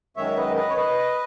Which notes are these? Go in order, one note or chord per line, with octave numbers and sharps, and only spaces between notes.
F#2 D#3 G#3 C#5 E5
B4 D#5
B4 D#5
C#5
B4 D#5